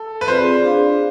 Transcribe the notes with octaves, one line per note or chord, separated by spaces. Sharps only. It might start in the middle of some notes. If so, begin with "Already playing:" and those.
Already playing: A4
B4
C4 F4 G#4 C5 D5
D4 G#4 D5 F5